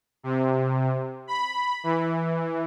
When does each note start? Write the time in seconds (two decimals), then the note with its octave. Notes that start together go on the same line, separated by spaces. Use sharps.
0.23 C3
1.27 B5
1.84 E3